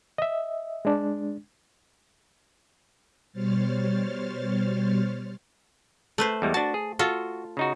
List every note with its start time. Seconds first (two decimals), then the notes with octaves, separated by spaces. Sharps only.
0.18 D#5 E5
0.85 G#3 D4
3.32 B2 G3 C5 C#5 F6 A6
6.18 A3 B4 C5
6.42 E2 G3 G#3
6.54 D4 F#4 A5
6.74 G#4
6.99 F4 F#4 A4
7.57 C#3 D#4 F#4